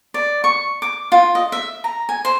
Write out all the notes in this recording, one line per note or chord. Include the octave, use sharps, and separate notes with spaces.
D5
C#6
D6
F4
D#5
E5
A#5
G#5
C5